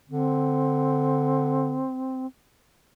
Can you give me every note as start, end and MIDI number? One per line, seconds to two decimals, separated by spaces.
0.10 1.84 50
0.10 2.27 60